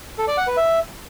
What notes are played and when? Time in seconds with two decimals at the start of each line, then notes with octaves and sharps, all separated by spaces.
0.18 A4
0.28 D5
0.38 F#5
0.47 B4
0.57 E5